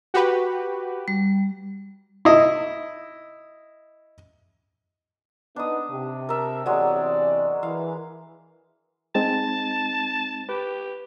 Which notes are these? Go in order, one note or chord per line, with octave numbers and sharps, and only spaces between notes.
F#4 G4 B4
G3
E4 D#5
B3 D4 D#4 D#6
C3
A#4 E5 A5
E2 C3 F#3 G#3 D5
E3 F5
G#3 C4 D#4 A5
G4 B4